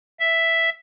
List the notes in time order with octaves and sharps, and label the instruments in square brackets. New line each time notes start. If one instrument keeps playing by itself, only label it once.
[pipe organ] E5